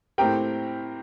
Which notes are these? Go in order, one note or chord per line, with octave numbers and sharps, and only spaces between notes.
A2 A3 C4 G4 A#4 G5